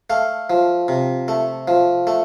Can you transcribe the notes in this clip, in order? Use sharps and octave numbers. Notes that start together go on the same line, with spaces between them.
A3 F5
F3
C3
A3
F3
A3